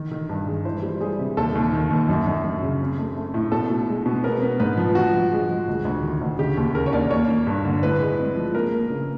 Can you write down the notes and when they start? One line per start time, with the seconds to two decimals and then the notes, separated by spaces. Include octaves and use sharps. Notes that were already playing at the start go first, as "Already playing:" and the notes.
Already playing: D#3
0.11 D#3
0.29 G2
0.47 G#3
0.65 E3 C5
0.83 G3
1.01 G3 G#4
1.19 C3
1.37 D#2 A4
1.55 D#2
1.73 D#3
1.90 D#2
2.09 F#2
2.27 F#2
2.44 F#2
2.63 C#3
2.81 C4
2.98 A3
3.17 A3
3.34 A2
3.52 B2 A4
3.70 B2
3.88 G#3
4.06 B2
4.24 B3 A#4
4.42 B3
4.60 G#2 B4
4.77 F3
4.95 F3 F#4
5.13 F3
5.32 G#3
5.49 F3
5.67 D2
5.85 D2
6.03 D#3
6.21 D2
6.39 C#3 G4
6.57 D#2
6.75 C#3 A#4
6.86 C#5
6.93 D#2 D5
7.11 A#3 C#5
7.29 A#3
7.47 G2
7.65 D3
7.83 A2 B4
8.00 G#3
8.19 C4
8.36 F3
8.55 A#3 A#4
8.72 A#3
8.90 C#3